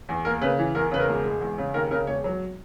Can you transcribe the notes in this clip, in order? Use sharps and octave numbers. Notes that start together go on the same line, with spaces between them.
E2
A#3 A#4
C#3 B4
E3
E2 A#4
C#3 B4
A#4
E1
G#3
E2
C#3
D#2 A#4
C#3 A#4
E1 C#5
F#3